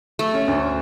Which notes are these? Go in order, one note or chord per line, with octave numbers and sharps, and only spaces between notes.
A3
C#4
D2